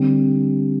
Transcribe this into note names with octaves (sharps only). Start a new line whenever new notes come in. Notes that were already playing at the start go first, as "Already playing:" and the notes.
Already playing: D3 G3 C4